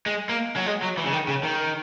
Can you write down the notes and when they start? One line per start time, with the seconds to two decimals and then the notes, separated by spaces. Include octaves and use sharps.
0.06 G#3
0.29 A#3
0.56 F#3
0.66 G#3
0.82 F#3
0.98 E3
1.05 C#3
1.13 D#3
1.28 C#3
1.43 D#3